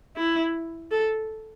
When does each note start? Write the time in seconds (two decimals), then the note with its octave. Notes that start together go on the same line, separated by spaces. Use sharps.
0.16 E4
0.91 A4